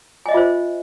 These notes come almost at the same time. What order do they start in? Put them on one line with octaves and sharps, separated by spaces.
G#5 D#5 E5 F4 C5